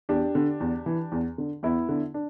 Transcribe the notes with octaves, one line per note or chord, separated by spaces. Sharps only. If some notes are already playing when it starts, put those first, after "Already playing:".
E2 D4 G4
D3
E2
E3
E2
D3
E2 B3 E4
D3
D4